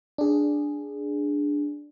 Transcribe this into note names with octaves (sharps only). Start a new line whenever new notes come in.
D4 G#4